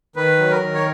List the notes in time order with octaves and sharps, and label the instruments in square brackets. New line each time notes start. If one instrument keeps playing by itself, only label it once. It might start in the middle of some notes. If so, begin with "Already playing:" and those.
[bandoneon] D#3 B4
F#3
A#4
D#3
C#5